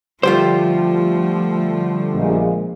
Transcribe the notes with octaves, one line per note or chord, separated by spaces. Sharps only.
D3 F3 G3 A3 F4 G4 C5
A#1 A#2 G#3